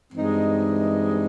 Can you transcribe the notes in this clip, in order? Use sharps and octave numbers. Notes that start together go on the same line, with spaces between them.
G2 E3 G#3 C4 D#4